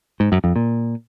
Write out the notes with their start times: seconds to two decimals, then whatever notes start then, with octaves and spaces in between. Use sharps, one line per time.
0.20 G#2
0.32 F#2
0.44 F2
0.56 A#2